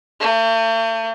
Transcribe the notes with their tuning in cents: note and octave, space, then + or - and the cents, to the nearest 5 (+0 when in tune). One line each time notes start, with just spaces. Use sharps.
A3 +45